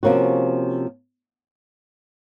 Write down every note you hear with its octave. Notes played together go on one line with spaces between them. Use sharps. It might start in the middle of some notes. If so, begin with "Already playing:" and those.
C3 F3 A#3 C#4 F#4